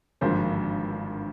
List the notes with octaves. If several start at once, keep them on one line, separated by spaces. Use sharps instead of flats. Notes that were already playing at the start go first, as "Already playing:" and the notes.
G#1 G2 D3 F3 A#3 C5